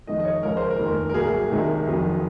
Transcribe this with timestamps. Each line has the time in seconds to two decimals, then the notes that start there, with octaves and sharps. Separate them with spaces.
0.07 F2 D#3 G#3 D#5
0.20 D#5
0.25 C#5
0.43 C#2 C#3 F3 G#3 A#4
0.57 C5
0.70 A#4
0.79 F1 D#2 D#3
1.09 A#4
1.14 C2 A#2 F#3 G#4
1.50 C2 C3 D#3 G#3
1.87 F#1 F2 D#3 F#3